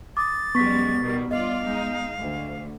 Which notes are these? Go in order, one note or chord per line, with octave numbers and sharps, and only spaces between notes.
D6 D#6 A6
F#2 G3 G#3 B3 C#6 B6
B2 D#3 G3
G2 F4 D5 D#5 F5
G#3 D#4
D2